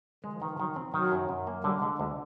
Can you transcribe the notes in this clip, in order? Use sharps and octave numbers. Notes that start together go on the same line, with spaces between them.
D#3 G#3
F3
D#3 E3
F3
D#3 F#3
F3 C4
D#3 F#3
F#2
F#2
A#3
D3 G3
D3 G#3
D2 G#3